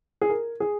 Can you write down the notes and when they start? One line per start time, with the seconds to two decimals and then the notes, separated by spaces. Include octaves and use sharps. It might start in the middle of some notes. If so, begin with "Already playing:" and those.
0.21 G#4
0.29 A#4
0.60 G#4